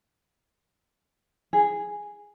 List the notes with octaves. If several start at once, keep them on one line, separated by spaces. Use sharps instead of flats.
G#4